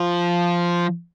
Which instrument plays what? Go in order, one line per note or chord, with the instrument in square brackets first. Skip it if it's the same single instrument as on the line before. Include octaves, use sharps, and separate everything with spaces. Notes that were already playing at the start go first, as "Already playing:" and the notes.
Already playing: [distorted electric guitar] F3